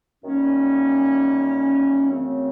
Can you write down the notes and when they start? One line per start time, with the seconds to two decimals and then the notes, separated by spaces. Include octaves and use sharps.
0.24 F#2 D#3 G3 A#3 C#4
2.09 F#2 C#3 E3 A3 C4